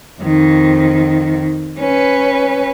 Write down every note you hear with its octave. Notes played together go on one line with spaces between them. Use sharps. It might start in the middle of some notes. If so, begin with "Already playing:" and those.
F2 D#3
C#4 B4